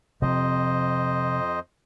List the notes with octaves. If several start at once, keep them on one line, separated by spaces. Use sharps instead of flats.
F2 C3 F3 C5 D#5